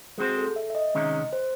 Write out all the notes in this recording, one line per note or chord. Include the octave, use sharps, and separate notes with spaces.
G#3 C4 F#4 G#4 C5
A4
E5
E5
D#5
C3 D#3 G#3 C#4
C5